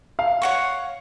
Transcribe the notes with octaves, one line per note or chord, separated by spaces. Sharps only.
F5
C#5 F#5 C#6